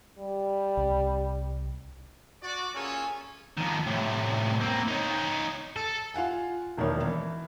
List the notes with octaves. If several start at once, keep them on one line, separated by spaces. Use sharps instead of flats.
G3
C2
F#4 D5
A#2 C#4 G#4 A4 C#5 G#5
F2 D#3
A2 C3
A#3 C4
D#4 C#5
A4
F4 F5 F#5 G#5
E1 B2 D#3 E3 A#3 C#5
E3